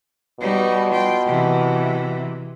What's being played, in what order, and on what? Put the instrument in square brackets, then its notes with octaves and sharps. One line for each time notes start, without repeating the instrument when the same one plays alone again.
[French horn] B2 [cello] G3 D#4
[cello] F4 G5
C3 E3